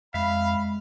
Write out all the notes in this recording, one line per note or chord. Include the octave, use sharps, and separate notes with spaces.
F2 G#3 E5 F5 B5